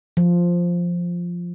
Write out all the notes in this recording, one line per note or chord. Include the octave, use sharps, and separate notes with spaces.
F3